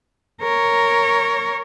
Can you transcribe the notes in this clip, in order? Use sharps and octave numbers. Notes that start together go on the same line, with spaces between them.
A#4 C#5